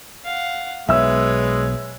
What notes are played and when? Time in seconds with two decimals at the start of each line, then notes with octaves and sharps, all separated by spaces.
0.25 F5 F#5
0.89 B1 G#3 B4 C#5 E5 E6